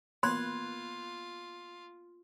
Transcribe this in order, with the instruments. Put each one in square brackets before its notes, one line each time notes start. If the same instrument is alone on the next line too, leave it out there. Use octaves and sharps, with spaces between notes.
[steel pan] A#3 B3 [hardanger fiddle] F4 [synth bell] B5 F#6 G#6 [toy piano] C6